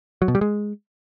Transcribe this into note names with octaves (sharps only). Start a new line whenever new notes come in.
F#3
B2
G3
G#3